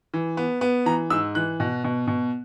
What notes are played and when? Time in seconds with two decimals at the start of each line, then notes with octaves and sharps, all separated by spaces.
0.14 E3
0.37 B3
0.61 B3
0.86 E3 A#5
1.10 G#2 E6
1.35 E3 F#6
1.60 B2
1.84 B2
2.07 B2